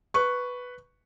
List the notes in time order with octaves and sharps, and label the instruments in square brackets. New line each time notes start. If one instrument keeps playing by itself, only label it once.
[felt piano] B4 C#6